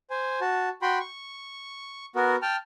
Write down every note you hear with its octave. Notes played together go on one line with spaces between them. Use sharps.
C5 G#5
F#4 A5
F#4 G5 B5 C6
C#6
B3 F#4 A#4
G5 A5 F6